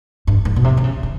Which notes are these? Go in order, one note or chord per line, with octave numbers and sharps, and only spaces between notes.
G2
G#2
B2
C3
D3
C#3
C#3